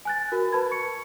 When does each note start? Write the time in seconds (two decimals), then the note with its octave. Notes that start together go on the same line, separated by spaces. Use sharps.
0.05 G#5 F#6 A6
0.32 F#4 A#4
0.52 B4 A5 B5 G#6
0.71 C#6 C#7